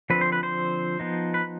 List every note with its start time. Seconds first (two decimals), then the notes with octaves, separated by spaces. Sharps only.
0.10 D3 F3 C4 B4
0.21 C5
0.32 B4
0.43 C5
1.00 F3 B3 D#4
1.34 B4